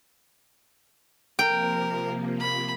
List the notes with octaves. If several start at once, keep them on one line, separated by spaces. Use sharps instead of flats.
C3 F3 A#3 A#4 G5
B5